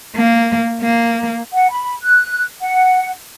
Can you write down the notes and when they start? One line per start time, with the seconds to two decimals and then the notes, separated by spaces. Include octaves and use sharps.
0.15 A#3
0.81 A#3
1.53 F#5
1.71 B5
2.03 F#6
2.61 F#5